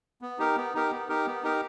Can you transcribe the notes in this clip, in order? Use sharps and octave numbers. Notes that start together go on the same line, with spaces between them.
B3
D#4 G4 A#4
B3
D#4 G4 A#4
B3
D#4 G4 A#4
B3
D#4 G4 A#4